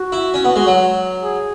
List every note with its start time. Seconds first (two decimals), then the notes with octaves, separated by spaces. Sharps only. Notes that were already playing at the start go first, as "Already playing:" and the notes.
Already playing: F#4
0.12 E4
0.34 C#4
0.44 B3
0.56 G#3
0.67 F#3
1.21 G#4